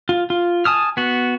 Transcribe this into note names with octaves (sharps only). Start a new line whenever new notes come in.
F4
F4
G#5 A5 D#6 F6
B3 F#4